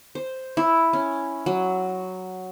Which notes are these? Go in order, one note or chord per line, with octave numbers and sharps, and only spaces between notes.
C5
E4
C#4
F#3